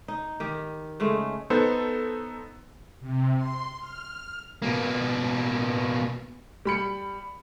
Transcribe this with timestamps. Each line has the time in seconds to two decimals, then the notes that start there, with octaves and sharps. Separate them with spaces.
0.08 D#4
0.40 D#3 G4
1.00 C#3 G#3 A3
1.50 B3 D#4 A4 C5
3.00 C3
3.36 C6
3.79 F6
4.62 B2 A#3
6.65 G3 B5 C#7